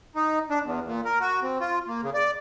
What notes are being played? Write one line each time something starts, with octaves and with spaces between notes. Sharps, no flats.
D#4
D4
E2
A#2
A#4
F#4
C4
F4
A#3
C#3
D5